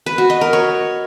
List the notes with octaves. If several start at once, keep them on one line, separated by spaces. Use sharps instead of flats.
B4
F#4
D#5
A#4
C#5